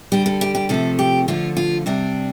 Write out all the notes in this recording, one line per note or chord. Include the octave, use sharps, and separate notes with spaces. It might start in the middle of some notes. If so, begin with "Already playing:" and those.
D3 G3 G4
A4
G4
G4
C3 F3 A3 A4
G4
D3 F3 A3 F4
F4
C3 G3 D4